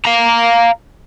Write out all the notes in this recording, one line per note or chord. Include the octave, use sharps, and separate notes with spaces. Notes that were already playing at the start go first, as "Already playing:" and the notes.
F5 A#5